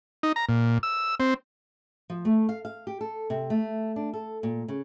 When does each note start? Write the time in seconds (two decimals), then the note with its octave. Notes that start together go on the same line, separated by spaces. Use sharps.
0.23 D#4
0.36 A#5
0.49 A#2
0.83 E6
1.20 C4
2.10 F3
2.25 A3
2.49 F5
2.65 F5
2.87 G4
3.01 A4
3.30 C3
3.50 A3
3.96 D4
4.13 A4
4.43 A#2
4.68 C#3